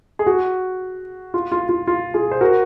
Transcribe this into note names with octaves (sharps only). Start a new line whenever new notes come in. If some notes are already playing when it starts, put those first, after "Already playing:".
G#4
F#4
F4
F4
F4
F4
F4 G#4
C5
F#4 A#4